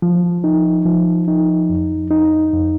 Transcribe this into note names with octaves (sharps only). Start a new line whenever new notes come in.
F3
D#4
F3
D#4
F2
D#4
F2